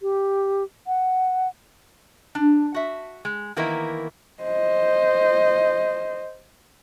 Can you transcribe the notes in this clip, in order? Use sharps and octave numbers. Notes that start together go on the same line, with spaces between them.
G4
F#5
D4
F#4 E5
G#3
D#3 E3 A#3 B3 E4 A#4
C5 D#5